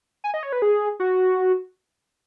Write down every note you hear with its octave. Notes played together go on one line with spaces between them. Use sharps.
G#5
D#5
C#5
B4
G#4
F#4